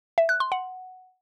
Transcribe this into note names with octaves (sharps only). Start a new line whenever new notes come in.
E5
F#6
C6
F#5